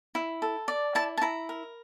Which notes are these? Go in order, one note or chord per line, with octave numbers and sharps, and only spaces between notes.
E4
A4
D5
E4 A5
A5
E4 A#5
A#4